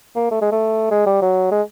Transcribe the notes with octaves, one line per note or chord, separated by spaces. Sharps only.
A#3
A3
G#3
A3
G#3
G3
F#3
G#3